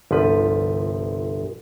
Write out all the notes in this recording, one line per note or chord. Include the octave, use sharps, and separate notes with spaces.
G1 C2 F3 B4